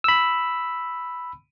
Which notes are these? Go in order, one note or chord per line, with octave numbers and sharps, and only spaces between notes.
B5 E6